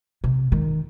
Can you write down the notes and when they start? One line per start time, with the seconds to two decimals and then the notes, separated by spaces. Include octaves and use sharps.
0.24 C3
0.52 D#3